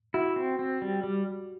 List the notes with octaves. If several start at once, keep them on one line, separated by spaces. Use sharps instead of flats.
E4 F#4
C4
C4
G3
G3